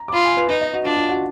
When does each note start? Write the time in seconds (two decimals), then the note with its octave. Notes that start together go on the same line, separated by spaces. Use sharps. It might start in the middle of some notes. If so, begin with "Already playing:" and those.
Already playing: A#5
0.08 D6
0.13 F4 B5
0.25 G#5
0.37 B4
0.49 D#4 B4
0.61 D#5
0.73 F#4
0.85 D4 F4
0.97 F4
1.09 F#4